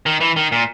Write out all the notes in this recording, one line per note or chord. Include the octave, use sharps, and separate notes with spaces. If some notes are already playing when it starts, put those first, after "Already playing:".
D#3
E3
D#3
A#2